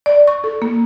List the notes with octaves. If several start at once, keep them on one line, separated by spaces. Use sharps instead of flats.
D5
C#6
A4
A#3